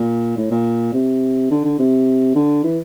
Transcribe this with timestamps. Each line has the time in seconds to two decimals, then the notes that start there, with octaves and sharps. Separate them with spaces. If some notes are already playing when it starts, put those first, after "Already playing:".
Already playing: A#2
0.37 A2
0.51 A#2
0.93 C3
1.51 D3
1.65 D3
1.79 C3
2.35 D3
2.64 E3